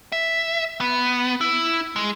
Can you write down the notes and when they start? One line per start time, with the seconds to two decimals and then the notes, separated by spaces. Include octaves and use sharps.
0.12 E5
0.81 B3
1.41 E4
1.96 G#3